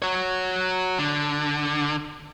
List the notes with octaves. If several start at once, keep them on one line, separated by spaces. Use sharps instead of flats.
F#4 C#5
D3